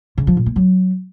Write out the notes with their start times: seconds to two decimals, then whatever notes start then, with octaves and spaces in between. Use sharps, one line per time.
0.18 C#3
0.27 F3
0.37 A#2
0.46 A#3
0.56 F#3